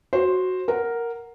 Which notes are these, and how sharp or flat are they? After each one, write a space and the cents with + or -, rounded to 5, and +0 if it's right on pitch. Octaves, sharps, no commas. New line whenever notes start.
F#4 +0 C5 +5
A#4 +0 F#5 +0